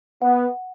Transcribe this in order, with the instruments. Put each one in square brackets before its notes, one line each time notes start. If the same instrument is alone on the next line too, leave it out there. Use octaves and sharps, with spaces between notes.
[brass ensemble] B3 [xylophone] F#5